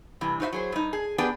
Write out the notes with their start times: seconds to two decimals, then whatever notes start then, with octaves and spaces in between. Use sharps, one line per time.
0.21 G2 C3 E3
0.40 D#4 F#4 C5 D#5 E5
0.53 F#3 G#4 C5
0.72 G2 D#4
0.93 G#4
1.18 B3 D4 G4 G#4 B4 G5